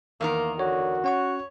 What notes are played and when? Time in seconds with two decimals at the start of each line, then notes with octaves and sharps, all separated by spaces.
0.21 E2 D#3 A#3 A#4
0.59 D3 F#4 C#5
1.04 C#4 C#5 F#5 C#6